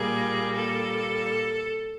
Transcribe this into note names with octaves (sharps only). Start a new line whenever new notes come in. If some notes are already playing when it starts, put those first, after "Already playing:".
Already playing: A#2 G3 A#3 G#4
A4